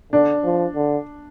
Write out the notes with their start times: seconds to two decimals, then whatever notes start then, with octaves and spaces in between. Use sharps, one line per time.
0.13 D3 D4
0.44 F3
0.76 D3